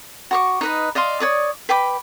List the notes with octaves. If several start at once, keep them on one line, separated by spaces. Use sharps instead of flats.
F#4 C#6 D6
D#4 B4 D#5
D5 D#5 F5 C6
C#5 D5 D#6
B4 G5 B5 D6